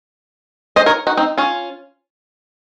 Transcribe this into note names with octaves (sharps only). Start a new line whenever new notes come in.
C5 D#5
A#4 C#5
D#4 F#4
C4 D#4
C#4 F4